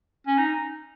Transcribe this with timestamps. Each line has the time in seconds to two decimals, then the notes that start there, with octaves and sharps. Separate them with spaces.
0.27 C#4
0.38 D#4